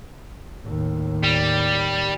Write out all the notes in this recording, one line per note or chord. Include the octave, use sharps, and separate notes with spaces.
D#2 A2
G3